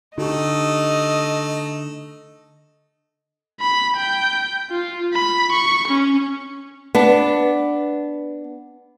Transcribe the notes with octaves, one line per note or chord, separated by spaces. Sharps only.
D3 A3 D#4 G4 D#5 C#6
B5
G5
F4
B5
C#6
C#4
B3 D4